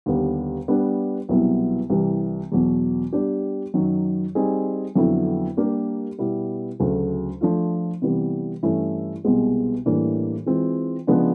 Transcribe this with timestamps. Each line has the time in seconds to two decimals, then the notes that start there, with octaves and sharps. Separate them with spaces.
0.06 D#2 D3 G3 B3
0.68 G3 B3 D4
1.29 C2 B2 F#3 B3 E4
1.90 C2 C3 E3 G3
2.52 E2 B2 F#3
3.13 G3 B3 D4 G4
3.74 F#2 D#3 F#3
4.35 G3 C4 D#4 G#4
4.95 F2 D3 F#3 B3 E4
5.57 G3 A#3 D4 G4 A#4
6.19 B2 G3 B3 E4
6.80 D2 C#3 F#3 A3
7.41 F3 A3 D4 F4
8.02 C3 E3 G3 B3
8.63 G2 E3 A3 C#4 E4
9.24 C2 B2 G#3 B3
9.86 A2 E3 G3 A#3 D4
10.46 E3 G#3 C4 F4
11.07 C#3 F3 G#3 B3 D4